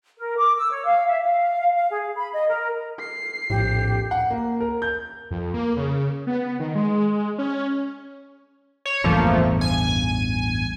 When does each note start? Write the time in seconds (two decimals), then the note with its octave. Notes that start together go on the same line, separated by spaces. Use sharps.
0.18 A#4
0.37 D6
0.57 E6
0.71 C#5
0.85 F5
1.07 E5
1.25 F5
1.75 F5
1.91 G#4
2.16 B5
2.33 D#5
2.49 A#4
3.00 C7
3.50 A#1 F2 A2 G4
4.11 F#5
4.30 A#3
4.60 A#4
4.82 G6
5.31 F2
5.54 A#3
5.77 C#3
6.27 B3
6.60 D#3
6.75 G#3
7.38 C#4
8.86 C#5
9.04 A1 E2 G2 F3 A3 A#3
9.61 G#5